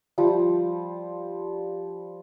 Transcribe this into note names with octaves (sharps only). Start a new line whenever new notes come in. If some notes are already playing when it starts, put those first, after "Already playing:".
F3 G3